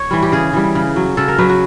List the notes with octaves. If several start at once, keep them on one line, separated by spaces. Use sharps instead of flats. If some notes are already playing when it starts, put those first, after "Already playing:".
Already playing: C#5
E3 G3
G4
C#3 G#4
E3 G3
C#3
F#3
C#3 A4
A#4
F#3 B4
F#4